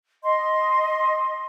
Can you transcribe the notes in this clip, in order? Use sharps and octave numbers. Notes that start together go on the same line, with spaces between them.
D#5 C6